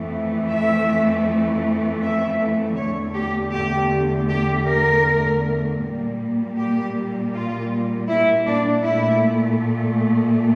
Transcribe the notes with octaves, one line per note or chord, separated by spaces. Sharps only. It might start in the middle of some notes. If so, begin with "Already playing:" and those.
Already playing: F2 E3 A3
E5
E5
E2 D3 A3 C#5
G4
G4
G4
A#4
A#2 G3 A#3
G4
F4
E4
D4
A#2 A3 E4